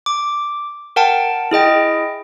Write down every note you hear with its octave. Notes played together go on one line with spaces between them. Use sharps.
D6
A#4 F#5 G5 A5
E4 G#4 D#5 G5